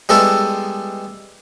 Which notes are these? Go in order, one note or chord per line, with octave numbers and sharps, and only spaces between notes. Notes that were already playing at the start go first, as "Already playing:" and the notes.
G3 G#3 B3 E4 A4 B4